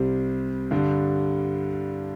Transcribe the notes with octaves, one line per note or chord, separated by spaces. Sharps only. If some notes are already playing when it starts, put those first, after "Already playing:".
Already playing: C2 C3 G3 C4
G2 D3 G3